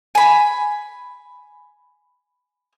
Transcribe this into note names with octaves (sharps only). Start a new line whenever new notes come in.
G#5 B5